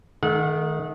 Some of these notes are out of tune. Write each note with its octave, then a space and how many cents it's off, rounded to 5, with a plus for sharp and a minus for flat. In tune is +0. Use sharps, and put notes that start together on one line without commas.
D#3 +0 A3 -45 F#5 -30